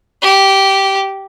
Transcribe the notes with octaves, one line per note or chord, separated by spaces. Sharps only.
G4